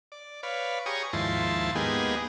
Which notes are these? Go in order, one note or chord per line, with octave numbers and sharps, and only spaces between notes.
D5
B4 C#5 D5 F5
G4 G#4 C#5 A#5 C#6 D#6
D#2 G#2 F3 E4 A5 C6
G#3 A#3 B3 D#4 G4 G#4